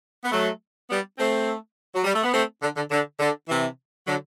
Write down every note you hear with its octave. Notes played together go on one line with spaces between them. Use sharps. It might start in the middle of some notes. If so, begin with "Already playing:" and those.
B3
F#3 A3
G3 B3
A3 C4
F#3
G3
A3
B3
A3 C4
D3
D3
D3
D3
C3 E3
D3 F#3